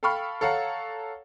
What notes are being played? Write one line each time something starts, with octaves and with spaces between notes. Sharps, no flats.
A4 F5 G5 B5 C#6 F6
A4 C#5 F5 F#5 A#5